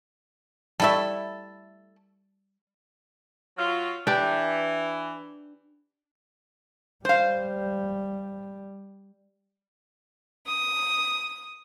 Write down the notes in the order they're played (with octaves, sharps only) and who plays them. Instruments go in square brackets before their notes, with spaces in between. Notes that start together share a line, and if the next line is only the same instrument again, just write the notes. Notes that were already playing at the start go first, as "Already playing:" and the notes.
[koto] G3 E5 [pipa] A3 E4 A4
[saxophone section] F#3 F4
[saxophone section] E3 [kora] D4 G4
[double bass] G3 [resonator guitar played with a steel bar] C5 F5
[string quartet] D#6